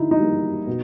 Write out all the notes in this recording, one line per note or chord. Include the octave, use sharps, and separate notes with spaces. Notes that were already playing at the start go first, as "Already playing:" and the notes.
Already playing: D3 D#4 E4
D#4
G3 A#3
B2